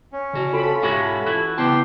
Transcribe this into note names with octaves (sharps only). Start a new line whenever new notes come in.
C#4
C#3 F#4
C4 F4 A4 B5
G#2 G#3 F#4 G4 E5
E3 F#4
C#3 B3 E4 G4 G5 A5 C6